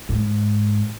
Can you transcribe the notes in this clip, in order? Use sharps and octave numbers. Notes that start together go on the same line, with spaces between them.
G#2